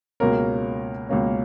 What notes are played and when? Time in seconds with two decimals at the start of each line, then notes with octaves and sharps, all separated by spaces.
0.20 C#2 B2 A#3 C#4 A#4
1.09 C#2 B2 A#3 C#4